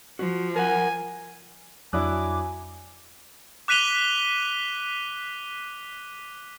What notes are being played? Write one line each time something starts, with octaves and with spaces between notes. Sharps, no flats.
F3 F#4
A#4 F#5 G#5
F2 F#3 D4 E4 G#5 D6 D#6 F#6
D6 F#6 B6 D#7 F7 G7